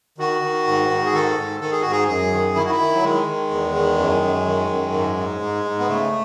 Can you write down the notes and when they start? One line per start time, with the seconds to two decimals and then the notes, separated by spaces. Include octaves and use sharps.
0.18 D#3 F#4
0.42 D#3
0.67 G#2
0.90 G#2
1.06 G#4
1.13 D#3 A4
1.37 G#2
1.60 D#3 A4
1.71 G#4
1.82 G#2 F#4
1.92 G#4
2.08 F#2 G#4
2.32 D#3
2.56 D#3 E4
2.64 F#4
2.70 E4
2.80 D#3
2.95 F#3
3.03 D#3 G#3
3.27 D#3
3.51 E2
3.74 D#3
3.98 F#2
4.21 F#2
4.46 D#3
4.69 F#2
4.93 G#2
5.17 G#2
5.41 G#2
5.65 G#2
5.79 B3
5.88 C#3 A3